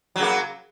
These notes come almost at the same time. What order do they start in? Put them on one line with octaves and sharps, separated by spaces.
F#3 C#3 A#3